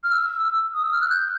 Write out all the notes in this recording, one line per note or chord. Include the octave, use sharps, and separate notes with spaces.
F6
E6
D#6
E6
F6
F#6
G6